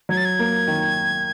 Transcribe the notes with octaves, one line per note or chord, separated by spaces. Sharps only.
F#3 G#6
A6
G#6
A#3
D#3